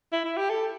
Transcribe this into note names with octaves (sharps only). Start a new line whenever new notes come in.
E4
E4
G4
A4